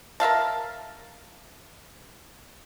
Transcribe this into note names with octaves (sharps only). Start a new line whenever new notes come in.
A#4 E5 F5 A5